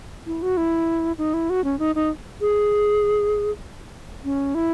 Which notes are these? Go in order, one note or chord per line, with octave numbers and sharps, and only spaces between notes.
E4
F#4
E4
D#4
E4
F#4
C#4
D#4
D#4
G#4
C#4
E4